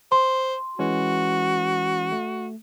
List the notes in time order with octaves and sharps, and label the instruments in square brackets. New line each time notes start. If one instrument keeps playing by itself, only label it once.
[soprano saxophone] C5 [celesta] C6
[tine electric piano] E3 G#3 C#4 [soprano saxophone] F#4
[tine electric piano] A3